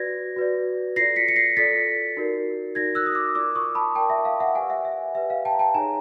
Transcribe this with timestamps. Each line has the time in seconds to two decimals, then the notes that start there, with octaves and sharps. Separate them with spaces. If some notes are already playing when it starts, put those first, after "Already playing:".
Already playing: F#4 B4 D5 G#6 A#6
0.36 F#4 B4 D5
0.96 F4 A4 D5 A#6 C7
1.16 B6 C#7
1.28 C#7
1.36 A#6 C7
1.57 F4 A4 D5 A6 B6
2.17 D#4 F#4 A#4 D5
2.75 D#4 F#4 A#4 D5 G#6 A#6
2.95 E6 F#6
3.06 D#6
3.15 D6 E6
3.35 F4 A#4 D5 D6 E6
3.55 C#6 D#6
3.75 A5 B5
3.95 F4 A#4 D5 G5 A5
4.10 E5
4.25 F5
4.40 E5 F#5
4.55 G4 B4 D5 F#5 G#5
4.70 E5 F#5
4.85 E5
5.15 G4 B4 D5 E5
5.30 F5
5.45 G5 A5
5.54 A#5
5.59 G5 A5
5.74 D#4 G#4 C#5 G#5 A#5